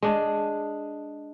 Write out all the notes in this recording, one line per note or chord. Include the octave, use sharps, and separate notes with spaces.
G#3 D4